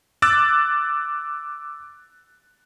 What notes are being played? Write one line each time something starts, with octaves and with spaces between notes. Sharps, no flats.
D6 E6 F#6 A6